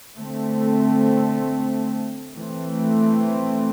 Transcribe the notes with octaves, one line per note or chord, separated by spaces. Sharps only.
D3 A3 C4
E3 A3 C4